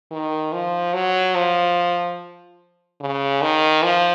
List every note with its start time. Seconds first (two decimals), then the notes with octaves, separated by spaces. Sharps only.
0.11 D#3
0.53 F3
0.94 F#3
1.35 F3
3.00 C#3
3.42 D#3
3.83 F3